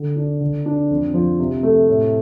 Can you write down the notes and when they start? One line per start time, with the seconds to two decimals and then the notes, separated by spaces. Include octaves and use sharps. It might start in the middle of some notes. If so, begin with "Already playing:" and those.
Already playing: D3
0.16 D4
0.41 D3
0.66 D4
0.90 F2
1.14 F3
1.39 C3
1.63 A3
1.89 A2